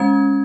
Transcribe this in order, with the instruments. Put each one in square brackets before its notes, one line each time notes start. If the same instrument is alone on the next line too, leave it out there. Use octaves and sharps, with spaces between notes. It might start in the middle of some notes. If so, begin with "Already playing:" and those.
Already playing: [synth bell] G#3 C#4 G#6